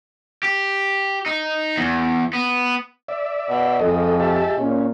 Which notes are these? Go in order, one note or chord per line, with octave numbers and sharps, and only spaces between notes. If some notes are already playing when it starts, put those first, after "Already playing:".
G4
D#4
E2
B3
D5 E5
B2
F2 G#3 A4 D#5
G4 E5 A5
A#2 C#4